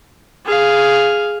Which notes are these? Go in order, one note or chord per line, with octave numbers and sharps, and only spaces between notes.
G#4 F5